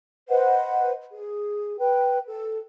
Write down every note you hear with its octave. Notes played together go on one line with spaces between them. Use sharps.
B4 C5 D#5 F#5
G#4
B4 G5
A4